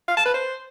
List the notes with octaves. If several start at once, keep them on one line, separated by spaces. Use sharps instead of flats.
F5
A5
B4
C5